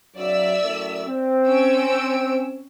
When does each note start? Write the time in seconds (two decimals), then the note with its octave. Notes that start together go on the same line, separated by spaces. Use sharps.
0.16 B1 C#3 F#3 D5 E5 E6
0.62 F#2 A2
1.07 C4
1.47 C#4 E6 D7